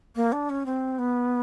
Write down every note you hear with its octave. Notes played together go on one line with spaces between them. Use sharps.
A#3
D4
C#4
C4
B3